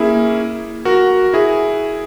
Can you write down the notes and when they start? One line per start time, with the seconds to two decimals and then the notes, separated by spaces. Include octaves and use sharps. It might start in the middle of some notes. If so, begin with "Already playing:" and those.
Already playing: A#3 C#4 E4 G#4
0.85 F#4 A#4
1.34 E4 G#4